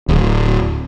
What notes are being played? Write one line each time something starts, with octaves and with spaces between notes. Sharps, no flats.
D1